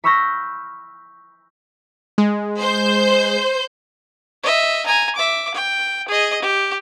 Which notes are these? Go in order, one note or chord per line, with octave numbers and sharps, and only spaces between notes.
B5 C#6 E6 F6 G6 A#6
G#3
C5 G6
D#5 E5
G#5 A#5
E5 D6
G5
G#4 D#5
G4